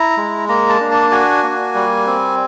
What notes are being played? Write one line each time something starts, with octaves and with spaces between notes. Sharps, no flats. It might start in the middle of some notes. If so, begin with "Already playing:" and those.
Already playing: E4 A#5
G#3
A#3 A#5
A5
D4
A5
F#4 G#5
A#3
G3
C4